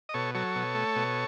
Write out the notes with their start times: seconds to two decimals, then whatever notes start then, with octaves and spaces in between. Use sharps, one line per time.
0.09 D#5
0.14 B2 A4 C#5
0.35 F#3 A4 C#5
0.55 B2
0.75 A3
0.96 B2